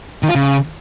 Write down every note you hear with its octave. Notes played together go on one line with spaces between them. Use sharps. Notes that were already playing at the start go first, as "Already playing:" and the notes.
D#3
F4
C#3